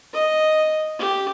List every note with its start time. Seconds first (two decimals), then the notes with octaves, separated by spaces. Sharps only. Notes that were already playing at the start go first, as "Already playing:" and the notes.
0.13 D#5
0.99 G4